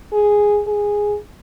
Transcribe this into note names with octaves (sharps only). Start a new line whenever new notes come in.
G#4
G#4